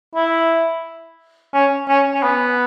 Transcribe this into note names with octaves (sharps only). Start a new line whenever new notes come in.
E4
C#4
C#4
C#4
B3